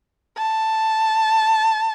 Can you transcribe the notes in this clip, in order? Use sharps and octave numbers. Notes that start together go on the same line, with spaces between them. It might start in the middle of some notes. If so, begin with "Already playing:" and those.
A5